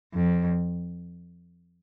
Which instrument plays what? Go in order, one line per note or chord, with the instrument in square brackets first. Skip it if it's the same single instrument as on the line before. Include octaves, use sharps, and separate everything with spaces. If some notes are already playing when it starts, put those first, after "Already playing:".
[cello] F2